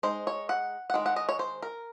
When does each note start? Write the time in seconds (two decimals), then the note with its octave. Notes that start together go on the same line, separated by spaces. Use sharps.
0.03 G#3 D#4 C5
0.27 C#5
0.49 F#5
0.90 F#5
0.94 D#3 G#3
1.06 F#5
1.16 D#5
1.29 C#5
1.39 C5
1.62 A#4